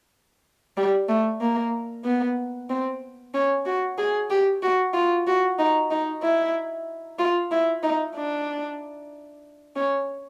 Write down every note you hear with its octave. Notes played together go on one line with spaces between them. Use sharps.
G3
A3
A#3
B3
C4
C#4
F#4
G#4
G4
F#4
F4
F#4
D#4
D#4
E4
F4
E4
D#4
D4
C#4